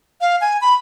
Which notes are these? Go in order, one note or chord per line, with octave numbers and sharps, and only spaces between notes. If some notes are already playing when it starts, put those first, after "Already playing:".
F5
G#5
B5